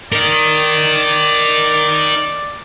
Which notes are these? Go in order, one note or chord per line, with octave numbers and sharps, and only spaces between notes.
A#4 D5 D#5